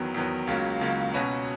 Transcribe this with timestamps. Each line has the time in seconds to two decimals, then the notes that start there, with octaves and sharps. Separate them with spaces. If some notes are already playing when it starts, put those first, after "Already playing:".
Already playing: E2 D#3 F#3 B3
0.14 E2 D#3 F#3 B3
0.47 C#2 C#3 F#3 A#3
0.81 C#2 C#3 F#3 A#3
1.14 B2 F#3 C#4 F#4 B4